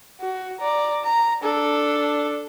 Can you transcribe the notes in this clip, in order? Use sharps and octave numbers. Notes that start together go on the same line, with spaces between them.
F#4
D5 A#5
A#5
D4 A4